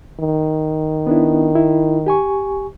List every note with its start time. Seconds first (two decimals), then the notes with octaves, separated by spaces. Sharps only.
0.20 D#3
1.07 B3 D4 E4
1.56 E4
2.06 G4 G#5 C#6